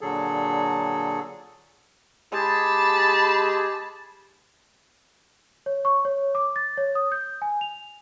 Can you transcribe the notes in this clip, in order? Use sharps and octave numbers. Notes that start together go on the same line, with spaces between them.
A#2 D3 F#3 G#4 A4
G#3 G4 G#4 A5 B5
C#5
C#6
C#5
D6
A6
C#5
D#6
G6
G#5
F7